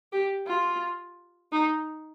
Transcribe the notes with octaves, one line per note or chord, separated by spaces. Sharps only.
G4
F4
D#4